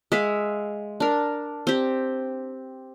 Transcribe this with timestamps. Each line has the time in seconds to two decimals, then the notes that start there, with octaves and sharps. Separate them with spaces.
0.12 G#3 E5 F5
1.00 D4 A#4
1.67 C4 G4